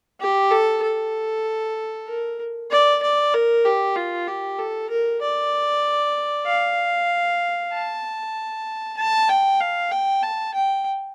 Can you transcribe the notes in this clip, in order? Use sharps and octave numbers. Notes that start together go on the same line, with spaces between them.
G4
A4
A4
A#4
D5
D5
A#4
G4
F4
G4
A4
A#4
D5
F5
A5
A5
G5
F5
G5
A5
G5